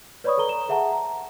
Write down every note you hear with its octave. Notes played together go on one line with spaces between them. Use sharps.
B4 C#5 D5 B5 C#6 D#6
A4 B4 A#5 G7
A#5 E7
G#4 E5 F#5 A5 A#5
A#5